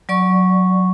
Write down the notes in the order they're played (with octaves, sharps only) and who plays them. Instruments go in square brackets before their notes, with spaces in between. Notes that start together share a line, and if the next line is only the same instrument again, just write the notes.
[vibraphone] F#3 D5 C#6